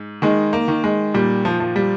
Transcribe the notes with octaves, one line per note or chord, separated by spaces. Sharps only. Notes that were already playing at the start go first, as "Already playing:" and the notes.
Already playing: G#2
D#3 G#3
A#3
D#3
G#3
A#2 G3
F3
F3
G3